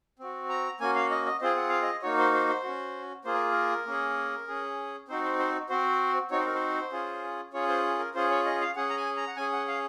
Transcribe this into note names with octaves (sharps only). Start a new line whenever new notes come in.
C4 F#4
A#5
A#3 C#4 F#4 G#5
F5
D#5
D#5
C4 F4 G#4 C5
F#5
F5
D#5
A#3 D#4 F#4 C#5
C5
C5
C5
C#4 F#4
A#3 F4 G#4 C5
A#4
A#4
A#3 C#4 G#4
C#4 G#4
C4 D#4 F#4 C5
C5
C5
C4 F#4 C5
C4 D#4 F#4 C#5
C5
A#4
C5
C#4 F4 G#4
C#4 F4 G#4 C#5
C5
A#4
C#4 F4 G#4 C5
C#5
D#5
F5
C#4 G#4 F#5
A#5
G#5
A#5
F#5
C#4 G#4 G#5
F#5
F5